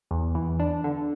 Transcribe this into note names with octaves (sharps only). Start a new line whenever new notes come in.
E2
E3
D4
D3